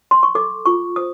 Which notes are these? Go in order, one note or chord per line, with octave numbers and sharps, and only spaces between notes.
C6
C#6
A4 D6
F4 C#6
C5 D#6